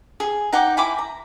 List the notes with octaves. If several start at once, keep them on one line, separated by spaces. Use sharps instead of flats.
G#4
D#4 F#5 G5 D6
E4 G#5 B5 D6
A#5